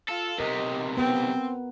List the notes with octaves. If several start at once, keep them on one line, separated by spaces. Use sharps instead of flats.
F4 A4
B1 C3 G4 A#4 D#5
B3 C4